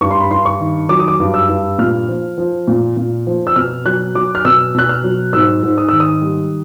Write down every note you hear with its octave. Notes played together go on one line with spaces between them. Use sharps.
G2 C#6
C6
B5
G2 C6
C#6
D#3
F#3 D6
D#6
D6
G2
E6
G2
A#2 F6
F3
F3
A#2
A#2
F3
E6
B2 F6
F#3 F#6
F#3 D6
F6
B2 E6
B2 F#6
F6
F#3
G#2 E6
G#2
D#6
D#3 E6
D#6
G3